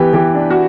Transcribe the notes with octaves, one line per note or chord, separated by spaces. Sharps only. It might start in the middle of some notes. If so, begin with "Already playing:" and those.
Already playing: E3 B3 G4 B4
E3 G4
D4
F#4